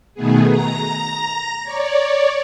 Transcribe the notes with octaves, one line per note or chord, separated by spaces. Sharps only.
B2 D#3 A3 B3 G#4
A#5 A#6
C#5 D5